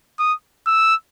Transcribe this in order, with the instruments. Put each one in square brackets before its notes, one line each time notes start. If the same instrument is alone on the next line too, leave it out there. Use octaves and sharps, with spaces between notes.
[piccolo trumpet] D#6
E6